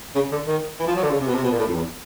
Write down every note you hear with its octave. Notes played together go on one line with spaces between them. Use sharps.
C#3
D3
D#3
E3
F3
F#3
D3
C#3
C3
B2
C3
B2
A#2
A2
F2
E2